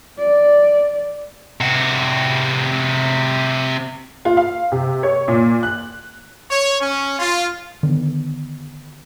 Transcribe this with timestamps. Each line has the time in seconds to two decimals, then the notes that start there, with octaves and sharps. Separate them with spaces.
0.18 D5
1.61 C3 F#4
4.25 F4
4.37 F5
4.72 C3
5.03 C#5
5.28 A#2
5.63 F#6
6.50 C#5
6.81 C#4
7.18 F4
7.83 D3 D#3 B3